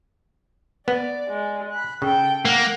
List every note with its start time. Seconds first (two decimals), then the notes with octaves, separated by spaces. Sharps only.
0.88 B3 D5
1.28 G#3 D5
1.71 B5 F#6
2.02 C#3 A4 G5
2.45 A#3 F#5